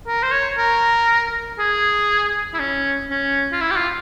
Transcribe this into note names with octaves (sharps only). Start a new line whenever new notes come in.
A#4
C5
C#5
A#4
G#4
E4
C#4
C#4
F4
E4
G4
F4